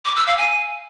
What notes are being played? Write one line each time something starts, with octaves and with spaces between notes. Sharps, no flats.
D6
E6
F5
G#5